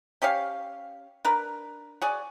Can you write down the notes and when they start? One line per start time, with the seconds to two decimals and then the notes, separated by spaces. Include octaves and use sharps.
0.22 C#4 G4 C#5 F5
1.25 D4 A#4 B4
2.02 F#4 G#4 D5